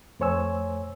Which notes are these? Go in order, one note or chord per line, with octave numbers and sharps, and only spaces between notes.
F2 A3 C5 C#5 G#5 E6